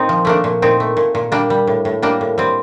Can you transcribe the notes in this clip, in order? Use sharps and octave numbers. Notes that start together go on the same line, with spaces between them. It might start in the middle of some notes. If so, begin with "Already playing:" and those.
Already playing: A#2 C4 D#4
F3
A3 A#3 D4
A#2
A#2 C4 D#4
A3
A#2
A#2
G3 A#3 D4
G3
A2
A2
G3 A#3 D4
A2
G3 C4